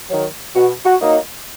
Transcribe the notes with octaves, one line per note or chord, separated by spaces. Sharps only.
D#3 F#3
B2 F#4
F#4
F#3 A#3 D#4